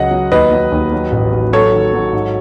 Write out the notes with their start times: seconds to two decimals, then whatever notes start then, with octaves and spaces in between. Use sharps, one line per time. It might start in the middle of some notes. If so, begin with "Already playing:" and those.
Already playing: C#2 F#3 D#5 F#5
0.11 F#3
0.32 D#2 B4 D#5
0.52 F#3
0.72 D#2
0.92 F#3
1.12 A1
1.32 A1
1.53 F#3 A4 C#5
1.72 D#3
1.94 F#3
2.13 G#2